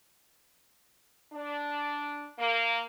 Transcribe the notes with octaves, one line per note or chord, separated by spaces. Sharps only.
D4
A#3